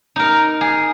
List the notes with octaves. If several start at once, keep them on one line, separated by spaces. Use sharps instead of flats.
D#4 A#4
G#4